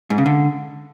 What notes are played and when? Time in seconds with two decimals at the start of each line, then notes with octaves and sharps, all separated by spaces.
0.10 G#2
0.18 C#3
0.26 D3